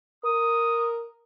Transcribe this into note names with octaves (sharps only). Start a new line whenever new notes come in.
A#4 D#6